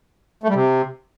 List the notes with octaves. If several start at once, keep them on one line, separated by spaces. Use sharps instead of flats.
A3
G3
C3